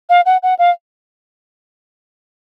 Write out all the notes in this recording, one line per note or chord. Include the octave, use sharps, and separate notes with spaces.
F5
F#5
F#5
F5